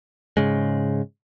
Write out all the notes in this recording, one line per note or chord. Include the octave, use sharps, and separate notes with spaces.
G#2 C#3 G#3